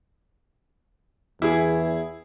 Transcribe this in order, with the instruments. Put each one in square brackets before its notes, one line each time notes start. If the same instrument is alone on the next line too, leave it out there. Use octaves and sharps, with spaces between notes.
[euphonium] E2 [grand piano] E4 G#4